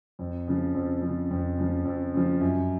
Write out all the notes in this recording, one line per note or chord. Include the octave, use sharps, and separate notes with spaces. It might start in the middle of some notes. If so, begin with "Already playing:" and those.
F2
C#3 F3
F2
C#3 F3
F2
C#3 F3
F2
C#3 F3
F#2